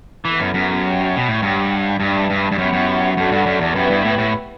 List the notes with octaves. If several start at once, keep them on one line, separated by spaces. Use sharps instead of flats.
E3 B3 E4 A4
F#2
F#2
G4 C#5 G5
B2
A2
G2 G4 C#5 F#5
G2 D4 G4 B4 E5 A5
G2
G2
F#2 B3 E4 G4 C#5 F#5
F#2
F#2 D4 F#4 A4
G2
F#2
E2
F#2 B3 E4 G4 B4 E5
G2
A2
A2